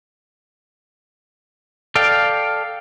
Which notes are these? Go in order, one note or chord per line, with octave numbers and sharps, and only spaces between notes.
A4 D5 F5 G5